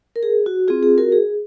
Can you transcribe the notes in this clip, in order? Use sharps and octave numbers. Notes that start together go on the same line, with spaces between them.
A#4
G#4
F#4
C4 F4 G#4
G#4
F#4 A#4
G#4